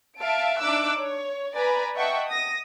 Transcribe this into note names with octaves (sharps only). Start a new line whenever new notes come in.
E5 F5 A5 D7
D4 D#4 E5 D6 E6 F#6
C#5
B4 D5 G#5 A#5 B5
D#5 E5 F#5 G5 A5 C#6
D#6 A#6